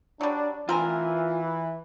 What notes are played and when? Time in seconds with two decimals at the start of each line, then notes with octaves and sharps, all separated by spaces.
0.21 F#3 G3 D4
0.69 E3 C4 F4 A#4 G#5